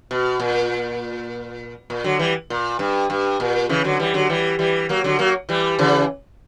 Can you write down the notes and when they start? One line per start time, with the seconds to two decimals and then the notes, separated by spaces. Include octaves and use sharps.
0.11 B2
0.40 A#2
1.90 A#2
2.04 D3 F#3
2.19 E3 G3
2.50 A#2
2.79 G2
3.10 G2
3.40 A#2
3.69 C#3 E3
3.84 D3 F#3
3.99 E3 G3
4.14 D3 F#3
4.29 E3 G3
4.59 E3 G3
4.89 F#3 A#3
5.04 D3 F#3
5.19 F#3 A#3
5.49 E3 G3
5.79 C#3 E3